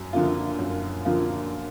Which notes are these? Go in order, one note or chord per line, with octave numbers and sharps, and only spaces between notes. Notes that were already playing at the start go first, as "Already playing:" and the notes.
Already playing: F#2
D3 F3 A#3 F4
F#2
D3 F3 A#3 F4